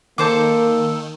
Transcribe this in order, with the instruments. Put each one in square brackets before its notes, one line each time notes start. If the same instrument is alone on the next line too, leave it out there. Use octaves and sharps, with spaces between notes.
[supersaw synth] D#3 [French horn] A#3 [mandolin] A4 C5 D6